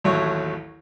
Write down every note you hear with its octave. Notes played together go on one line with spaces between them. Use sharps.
A1 D#2 F#3 A3 C#5